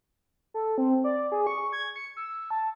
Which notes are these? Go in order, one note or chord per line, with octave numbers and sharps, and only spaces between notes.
A4
C4
D5
G#4
C#6
G#6
C#7
E6
A5